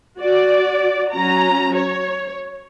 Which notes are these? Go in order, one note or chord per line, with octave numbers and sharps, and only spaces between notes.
F#4 D5
F#3 C#4 A#5
C#5